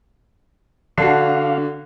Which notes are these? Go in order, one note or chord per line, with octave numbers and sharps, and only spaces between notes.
D3 D4 F#4 F5